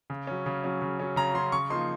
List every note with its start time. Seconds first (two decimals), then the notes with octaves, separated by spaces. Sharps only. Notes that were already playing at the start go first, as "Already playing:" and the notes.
0.10 C#3
0.27 F#3 C#4
0.46 C#3
0.64 F#3 C#4
0.82 C#3
0.99 F#3 C#4
1.16 C#3 A#5
1.34 F#3 C#4 C6
1.52 C#3 C#6
1.70 F3 A#3 D#4 C6